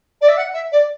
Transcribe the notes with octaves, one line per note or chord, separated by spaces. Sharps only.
D5
E5
F#5
E5
D5